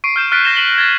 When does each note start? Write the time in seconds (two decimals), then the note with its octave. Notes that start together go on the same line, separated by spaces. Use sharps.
0.04 C#6 C7 D7 D#7
0.16 F6 G6 E7
0.32 F6 F#6 A6 B6 D7
0.45 G6 A#6 C7 E7 G7
0.57 B6 D#7 E7 F#7
0.78 G#6 A6